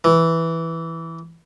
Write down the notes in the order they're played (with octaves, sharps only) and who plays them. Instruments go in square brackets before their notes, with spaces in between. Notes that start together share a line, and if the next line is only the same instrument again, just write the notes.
[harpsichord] E3